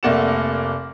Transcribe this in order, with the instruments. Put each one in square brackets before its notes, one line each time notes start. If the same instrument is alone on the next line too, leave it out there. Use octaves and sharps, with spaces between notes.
[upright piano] F1 A3 A#3 D5 F#5 E7